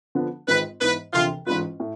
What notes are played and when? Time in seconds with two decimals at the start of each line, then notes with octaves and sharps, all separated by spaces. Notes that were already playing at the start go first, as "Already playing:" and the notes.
0.15 D3 F3 B3
0.47 G#1 G#2 G#3 C4 F4 B4
0.81 G#2 E3 B3 B4
1.13 E1 D2 C3 F3 F4
1.47 A1 G#2 G#3 D4 F4 B4
1.80 A2